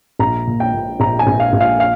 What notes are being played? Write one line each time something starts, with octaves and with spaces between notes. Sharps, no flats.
A#1 A#5
A#2
G5
A#2
A#1 A#5
G#5
A#1
F5
A#1
F5
F5